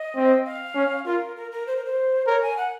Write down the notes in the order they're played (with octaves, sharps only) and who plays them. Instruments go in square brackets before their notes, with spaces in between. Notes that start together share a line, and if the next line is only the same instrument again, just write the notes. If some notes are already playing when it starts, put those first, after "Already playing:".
Already playing: [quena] D#5
[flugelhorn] C4
[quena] F5
[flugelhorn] C#4
[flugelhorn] F4 [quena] A#4
[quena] A#4
A#4
C5
A#4
C5
[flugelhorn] A#4 [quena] C#5
[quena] G#5
F#5